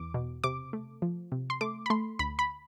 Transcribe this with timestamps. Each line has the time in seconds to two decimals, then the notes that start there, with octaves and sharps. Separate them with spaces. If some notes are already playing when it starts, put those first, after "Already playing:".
Already playing: E2 D6
0.14 B2
0.44 C3 D6
0.73 A3
1.02 F3
1.32 C3
1.50 C6
1.61 A3 D6
1.86 B5
1.90 A3 C6
2.19 D2 B5
2.39 B5